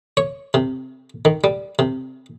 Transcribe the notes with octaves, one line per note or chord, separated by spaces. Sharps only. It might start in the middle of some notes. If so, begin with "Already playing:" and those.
C#5
C3
D#3
G3
C3